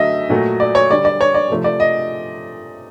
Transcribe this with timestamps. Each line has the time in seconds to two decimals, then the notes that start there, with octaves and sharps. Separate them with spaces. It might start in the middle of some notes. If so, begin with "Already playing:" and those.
Already playing: D3 F#3 A3 D#5 E5
0.30 A#2 F#3 A3
0.60 D5
0.75 C#5
0.91 D3 G3 D5
1.05 D5
1.21 C#5
1.34 D5
1.50 C3 F3 A3
1.64 D5
1.80 D#5